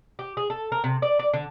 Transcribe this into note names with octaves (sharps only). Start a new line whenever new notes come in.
G4
G#4
A4
A#4
C3
D5
D5
D3